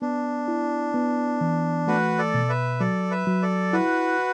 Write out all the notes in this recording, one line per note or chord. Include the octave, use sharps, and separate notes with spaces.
B3 D4
E4
B3
E3
A3 F#4 B4
A4 D5
B2
B4 E5
F#3 A4 D5
B4 E5
F#3
A4 D5
E4 F#4 B4